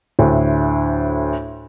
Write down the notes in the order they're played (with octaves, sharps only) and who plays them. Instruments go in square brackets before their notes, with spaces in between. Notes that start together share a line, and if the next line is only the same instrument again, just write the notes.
[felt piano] D2 A2